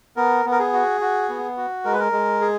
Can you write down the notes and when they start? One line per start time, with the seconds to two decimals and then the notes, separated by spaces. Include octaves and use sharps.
0.16 B3 A#4
0.45 B3
0.52 A#4
0.59 G#4
0.73 F#4
1.01 F#4
1.29 B3
1.57 F#4
1.85 G#3 A#4
1.92 B4
2.00 A#4
2.12 G#3
2.41 G#4